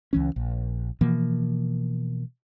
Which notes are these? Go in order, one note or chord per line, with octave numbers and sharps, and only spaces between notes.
C#2 E3 C#4
A#1
B2 E3 F3 A#3